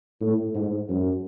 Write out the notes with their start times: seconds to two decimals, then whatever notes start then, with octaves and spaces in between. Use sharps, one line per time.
0.21 A2
0.54 G#2
0.89 F#2